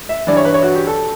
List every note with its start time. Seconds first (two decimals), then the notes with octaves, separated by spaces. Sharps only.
0.09 E5
0.27 G2 E3 D5
0.37 C#5
0.45 B4
0.54 C#5
0.63 F#4
0.75 G4
0.87 A4